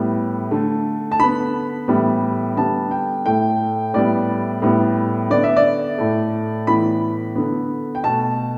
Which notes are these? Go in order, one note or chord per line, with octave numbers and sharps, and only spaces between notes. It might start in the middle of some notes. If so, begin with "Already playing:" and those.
Already playing: A2 G3 B3
D3 A3
A5
D3 B3 B5
A2 E3 G3 B3
D3 G3 B3 A5
G5
A2 A3 G5
A2 G3 B3 D5
A2 G3 B3
D3 B3 D5
E5
D5
A2 A3
A2 E3 B3 B5
D3 B3
G5
B2 A3 A5